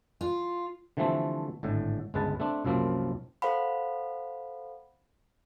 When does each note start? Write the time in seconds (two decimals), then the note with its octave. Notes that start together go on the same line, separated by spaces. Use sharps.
0.21 F4
0.97 D3 E3 F3 G3 A3 C4
1.63 G#1 A2 D3
2.14 G1 C#2 G#3 B4 A5
2.40 A3 C4 D4
2.65 C2 F#2 F3 A#3 C4
3.42 A4 C5 F5 F#5 B5